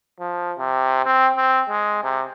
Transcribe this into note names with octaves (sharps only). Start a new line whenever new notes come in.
F3
C3
C4
C4
G#3
C3